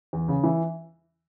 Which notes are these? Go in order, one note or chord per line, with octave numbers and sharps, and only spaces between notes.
E2
C#3
E3